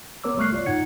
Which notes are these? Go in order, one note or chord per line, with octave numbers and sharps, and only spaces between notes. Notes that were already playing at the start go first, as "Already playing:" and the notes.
B3 A#4 C#5 D6 E6
G3 A3 C#6 F6 F#6 C7
F4 C#5 D5
G#2 D#4 F#5 G#6 C#7